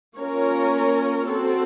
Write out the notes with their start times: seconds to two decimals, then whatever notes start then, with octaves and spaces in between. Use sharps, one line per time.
0.18 A#3 C#4 F4 A#4 C#5
1.29 C4 F#4 A4